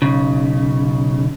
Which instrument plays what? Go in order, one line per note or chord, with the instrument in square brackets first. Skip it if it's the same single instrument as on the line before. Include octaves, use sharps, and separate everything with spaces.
[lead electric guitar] B1 C#3